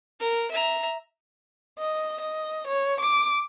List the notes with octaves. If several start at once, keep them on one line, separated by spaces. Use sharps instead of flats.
A#4
E5 A#5
D#5
D#5
C#5
D6